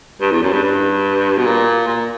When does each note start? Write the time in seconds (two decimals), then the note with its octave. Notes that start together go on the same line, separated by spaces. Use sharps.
0.21 G2
0.32 E2
0.42 F#2
0.52 G2
0.63 G2
1.37 B2
1.45 A#2
1.87 A#2